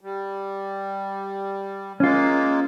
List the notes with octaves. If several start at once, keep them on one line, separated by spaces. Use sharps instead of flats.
G3
G#3 A#3 C#4 F4